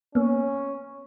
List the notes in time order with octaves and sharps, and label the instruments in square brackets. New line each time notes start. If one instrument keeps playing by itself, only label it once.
[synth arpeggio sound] A#3 B3 [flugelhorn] C#4